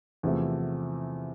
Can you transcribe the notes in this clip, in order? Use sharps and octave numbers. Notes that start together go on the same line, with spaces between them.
E2 C3 F3 A3